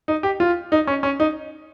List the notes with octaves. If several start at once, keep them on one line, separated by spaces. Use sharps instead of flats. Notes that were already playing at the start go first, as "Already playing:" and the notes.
D#4
G4
F4
D#4
C#4
C#4
D#4